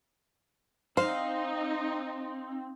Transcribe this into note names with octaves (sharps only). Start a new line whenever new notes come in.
C4 D#4 C5 F5